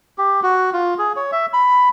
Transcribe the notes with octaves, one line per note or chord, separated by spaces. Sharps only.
G4
F#4
F4
G#4
C#5
E5
B5